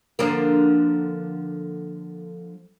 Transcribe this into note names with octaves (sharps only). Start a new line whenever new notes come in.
D3 F3 A#3